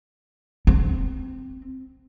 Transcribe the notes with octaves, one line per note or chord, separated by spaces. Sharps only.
C4